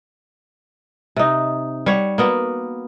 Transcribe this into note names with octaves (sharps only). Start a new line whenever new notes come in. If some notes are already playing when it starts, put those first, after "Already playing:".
C3 D#4
G3 C#5 F#5
A#3 B3 F#4